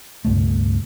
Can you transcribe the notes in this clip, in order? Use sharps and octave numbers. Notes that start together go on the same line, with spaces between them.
C#2 G2 B2 A3